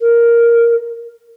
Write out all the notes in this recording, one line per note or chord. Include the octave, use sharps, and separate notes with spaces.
A#4